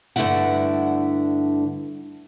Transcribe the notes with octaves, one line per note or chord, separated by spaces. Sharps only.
G2 D3 A3 C#4 E4 F#5